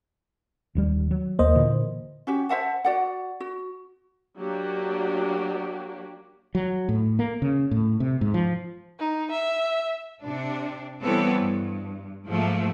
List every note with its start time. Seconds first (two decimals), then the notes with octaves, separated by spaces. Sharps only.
0.75 D#1 D#2 G3
1.11 F#3
1.39 D#2 A#3 B3 C5 D#5
1.55 A#2 D3 E3
2.27 C#4 F#4 G4
2.49 C5 E5 F#5 A5
2.85 F#4 D5 F#5
3.40 F#4
4.39 F#3 A#3 D4 F#4 G4
6.55 F#3
6.89 A2
7.19 A#3
7.42 C#3
7.71 A2
8.00 C3
8.21 G#2
8.34 F3
8.99 D#4
9.31 E5
10.22 C3 D4
11.02 E3 G3 B3 C4 A4 C#5
11.39 G2
12.27 G#2 F3 A3 A#3